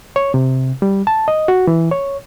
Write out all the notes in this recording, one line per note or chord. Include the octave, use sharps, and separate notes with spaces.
C#5
C3
G3
A5
D#5
F#4
E3
C#5